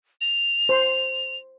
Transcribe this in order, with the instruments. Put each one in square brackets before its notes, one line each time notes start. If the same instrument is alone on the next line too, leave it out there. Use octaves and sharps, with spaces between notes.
[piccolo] F7
[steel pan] C5 C6